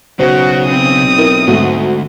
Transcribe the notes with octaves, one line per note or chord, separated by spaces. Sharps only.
B1 C#3 F#4 C5
C4 D#6
E4 A#4
D2 G#2 A3 F#4